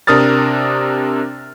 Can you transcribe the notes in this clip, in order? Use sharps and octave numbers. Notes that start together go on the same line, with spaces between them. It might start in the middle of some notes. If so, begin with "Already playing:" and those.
C3 D4 A#4 D#6 F6 A6